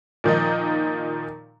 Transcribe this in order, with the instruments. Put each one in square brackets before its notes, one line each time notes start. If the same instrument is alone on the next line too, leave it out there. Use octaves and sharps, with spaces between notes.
[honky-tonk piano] A#2 D#3 F3 D#4